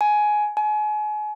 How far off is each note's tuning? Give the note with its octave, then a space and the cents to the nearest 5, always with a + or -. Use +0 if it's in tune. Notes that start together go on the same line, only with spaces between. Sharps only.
G#5 +15
G#5 +35